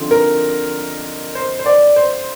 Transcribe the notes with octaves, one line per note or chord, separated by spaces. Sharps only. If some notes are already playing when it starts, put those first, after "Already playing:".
Already playing: D3 F3 C4 D#4
A#4
C5
C5
D5
C5